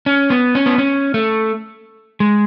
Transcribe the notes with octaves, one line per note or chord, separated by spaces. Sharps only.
C#4
B3
C#4
B3
C#4
A3
G#3